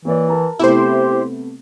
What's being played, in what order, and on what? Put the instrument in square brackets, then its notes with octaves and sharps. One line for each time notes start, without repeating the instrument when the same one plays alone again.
[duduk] E3 [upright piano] A#3 C#5 D5
[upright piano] A#4 A5 A#5
[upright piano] C3 A3 B3 [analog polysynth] E4 C5 [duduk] G4